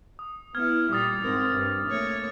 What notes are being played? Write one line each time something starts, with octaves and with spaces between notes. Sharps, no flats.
D#6
B3 E4 F6 G#6
A#2 G3 D6 D#6 A6
G#2 C4 A#4
G2
A3 A#3 C#5